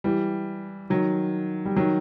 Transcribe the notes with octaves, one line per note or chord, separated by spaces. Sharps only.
E3 G3
D#3 F#3
G3
D#3 F#3